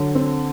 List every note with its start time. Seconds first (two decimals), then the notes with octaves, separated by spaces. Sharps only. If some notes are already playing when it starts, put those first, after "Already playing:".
Already playing: D3 F#3
0.15 C4